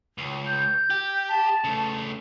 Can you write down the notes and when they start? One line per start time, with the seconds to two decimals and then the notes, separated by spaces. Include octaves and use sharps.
0.18 C#2
0.47 G6
0.90 G4
1.29 A5
1.64 C#3 A3